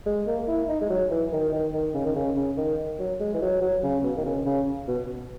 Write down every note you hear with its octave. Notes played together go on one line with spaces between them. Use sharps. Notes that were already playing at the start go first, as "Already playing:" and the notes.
G#3
A#3
E4
D#4
G#3
F#3
E3
D#3
D#3
D#3
C#3
D#3
C#3
C#3
D#3
F#3
G#3
E3
F#3
F#3
C#3
B2
D#3
C#3
C#3
B2